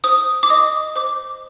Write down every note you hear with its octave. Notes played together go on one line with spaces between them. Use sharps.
C5 D#6
D6
D#5 D#6
C5 D6